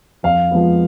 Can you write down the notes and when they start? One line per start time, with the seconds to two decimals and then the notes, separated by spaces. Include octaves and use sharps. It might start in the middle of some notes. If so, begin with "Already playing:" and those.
0.23 F2 F5
0.51 F3 G#3 B3